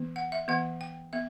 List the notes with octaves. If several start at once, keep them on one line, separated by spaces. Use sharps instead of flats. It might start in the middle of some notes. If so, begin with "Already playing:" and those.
Already playing: E3 B3
F#5
E5
E3 B3 F#5
G5
B3 E5